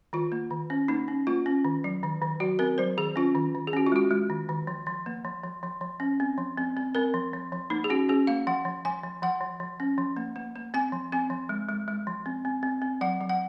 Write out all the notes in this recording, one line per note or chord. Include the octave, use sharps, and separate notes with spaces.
D#3 F4
A#3
D#3
C#4
A#3 D#4
C#4
A#3 F4
C#4
D#3
F#3
D#3
D#3
F#3 F#4
C4 A#4
F#3 C5
D#3 G#4
C#4 F4
D#3
D#3
G#4
C#4 F#4
F4
G#3 F#4
G#3
D#3
D#3
F3
F3
A#3
F3
F3
F3
F3
C#4
C4
F3
C4
C4
C4 A#4
F3
F3
F3
A#3 D#4
G#4
C#4 F#4
C#4 G#4
A#3 F5
F3 F#5
F3
F3 G#5
F3
F3 F#5
F3
F3
C#4
F3
A#3
A#3
A#3
C4 G#5
F3
C4 G#5
F3
G#3
G#3
G#3
F3
C4
C4
C4
C4
F#3 F#5
F#3
F#5